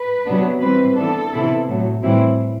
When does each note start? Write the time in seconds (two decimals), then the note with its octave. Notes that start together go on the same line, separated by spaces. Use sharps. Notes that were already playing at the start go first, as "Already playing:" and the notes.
Already playing: B4
0.26 C3 F#3 B3 D4
0.61 E3 G3 C4 B4
0.95 E3 B3 D4 A4
1.32 C3 E3 B3 E4
1.67 A2 F#3 A3
2.02 A2 E3 G3 C4 E4